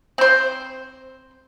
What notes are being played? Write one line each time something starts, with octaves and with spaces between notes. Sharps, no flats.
C4 C5